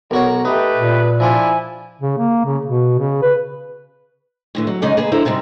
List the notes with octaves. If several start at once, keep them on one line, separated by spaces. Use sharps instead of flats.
B1 F#4 A#4 C#5
A3 D#4 G4 B4
A#2
F3 D4 E4 F4 G#5
C#3
A#3
C#3
B2
C#3
B4
A2 D3 E3
F#3
C#3 G#3 C#4 D#4 D5 G#5
A#3 G#4 B4
D3 E4 C5 A#5
G#2 C3 G3 G#3